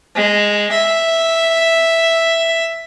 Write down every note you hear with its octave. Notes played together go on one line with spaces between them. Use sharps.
G#3
E5